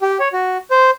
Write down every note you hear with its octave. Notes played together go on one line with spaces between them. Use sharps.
G4
C#5
F#4
C5